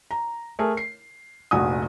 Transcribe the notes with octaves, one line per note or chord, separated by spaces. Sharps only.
A#5
A3 G#4 A#4
C7
F1 A#1 F#4 G#5 D#6